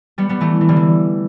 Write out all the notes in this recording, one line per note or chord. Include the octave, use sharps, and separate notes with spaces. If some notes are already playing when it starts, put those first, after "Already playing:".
G3 B3
G3 B3
E3 A3
E3
D3 G3
E3